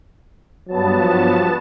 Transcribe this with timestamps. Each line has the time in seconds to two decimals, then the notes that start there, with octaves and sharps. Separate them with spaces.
0.68 G2 F#3 B3 A5
0.99 F3